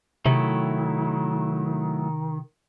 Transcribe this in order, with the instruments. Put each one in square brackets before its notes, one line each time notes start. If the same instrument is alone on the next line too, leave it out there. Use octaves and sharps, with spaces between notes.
[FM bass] C3 [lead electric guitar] D#3 [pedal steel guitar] F#3 A3 E4